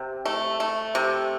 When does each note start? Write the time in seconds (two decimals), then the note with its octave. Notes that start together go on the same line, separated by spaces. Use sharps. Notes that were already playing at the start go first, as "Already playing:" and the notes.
Already playing: C3
0.25 A3
0.60 A3
0.95 C3